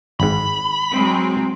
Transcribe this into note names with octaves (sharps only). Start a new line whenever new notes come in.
G#1 G#2 B5
F#3 G#3 C4